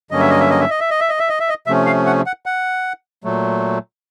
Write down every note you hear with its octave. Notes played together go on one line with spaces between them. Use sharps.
G2 D3 F#3 A#3 C#4 D#5
E5
D#5
E5
D#5
E5
D#5
E5
D#5
E5
D#5
E5
D#5
E5
D#5
C3 F3 A3 C#4 E5
F5
F#5
F#5
F#5
A#2 F#3 A3